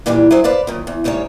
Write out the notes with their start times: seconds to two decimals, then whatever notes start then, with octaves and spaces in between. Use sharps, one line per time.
0.06 A#2 E3 G3 D4 G4
0.31 F#3 G#4 C5 E5
0.44 B4 C5 D5 F5
0.67 F#2 A#2 D#3
0.87 E2
1.04 D2 C#3 G3 D#4 C#5